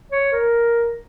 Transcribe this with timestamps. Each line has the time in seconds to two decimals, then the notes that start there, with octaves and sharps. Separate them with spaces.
0.12 C#5
0.32 A#4